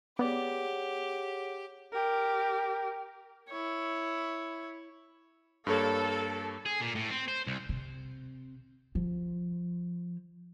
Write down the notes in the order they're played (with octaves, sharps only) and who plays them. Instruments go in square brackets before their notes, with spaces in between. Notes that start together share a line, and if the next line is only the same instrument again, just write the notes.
[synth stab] B3 D5 [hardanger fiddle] G4 [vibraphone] G#4 C#5 F#5
[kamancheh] G4 A#4
[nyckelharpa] E4 C#5
[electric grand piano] G2 A#3 C#5 [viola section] A4
[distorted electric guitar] G#4
A#2
A2
C4
C5
C2
[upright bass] C3
F3